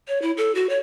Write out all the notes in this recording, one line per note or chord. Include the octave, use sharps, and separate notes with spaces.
C#5
E4
A4
F#4
C#5